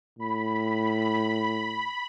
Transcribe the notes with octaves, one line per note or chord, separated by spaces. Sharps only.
A2 B5
B5